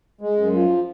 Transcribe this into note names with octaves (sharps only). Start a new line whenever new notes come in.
G#3
F#2
F3